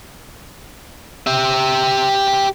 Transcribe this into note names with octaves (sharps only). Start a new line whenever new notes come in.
G4 E5